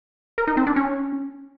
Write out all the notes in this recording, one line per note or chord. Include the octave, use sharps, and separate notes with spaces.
A#4
D#4
C4
D4
C#4